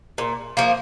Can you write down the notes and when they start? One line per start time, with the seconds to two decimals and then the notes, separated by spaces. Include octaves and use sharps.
0.18 A#2
0.57 F3 A#3